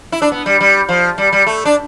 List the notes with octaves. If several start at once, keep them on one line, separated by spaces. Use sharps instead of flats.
E4
D4
B3
G3
G3
F3
G3
G3
A3
D4